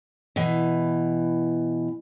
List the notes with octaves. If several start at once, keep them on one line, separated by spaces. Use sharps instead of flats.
B2 E3